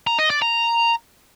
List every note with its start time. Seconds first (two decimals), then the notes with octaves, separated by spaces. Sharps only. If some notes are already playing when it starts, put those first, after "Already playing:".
0.07 A#5
0.19 D#5
0.30 D5
0.42 A#5